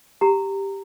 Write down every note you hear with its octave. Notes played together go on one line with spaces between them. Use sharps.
G4 A#5